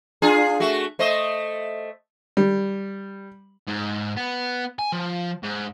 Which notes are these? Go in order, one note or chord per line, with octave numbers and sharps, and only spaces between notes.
D4 F4 G#4
A3 F#4
A3 C5 D#5
G3
G#2
B3
G#5
F3
G#2